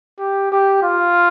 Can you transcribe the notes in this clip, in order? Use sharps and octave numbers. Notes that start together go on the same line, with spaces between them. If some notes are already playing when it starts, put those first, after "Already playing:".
G4
G4
F4